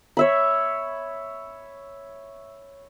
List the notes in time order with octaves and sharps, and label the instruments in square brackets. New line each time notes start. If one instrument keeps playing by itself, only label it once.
[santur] C#5 E5 B5